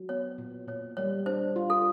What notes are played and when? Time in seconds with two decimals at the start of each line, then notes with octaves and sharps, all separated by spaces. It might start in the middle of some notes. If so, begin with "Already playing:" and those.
Already playing: F#3
0.09 B3 C#5
0.38 A#2
0.68 A#2 C#5
0.97 G3 C#5
1.26 D4 C5
1.56 F4
1.70 A4